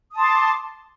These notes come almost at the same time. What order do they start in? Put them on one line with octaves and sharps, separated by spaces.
D#6 A5 C6 D6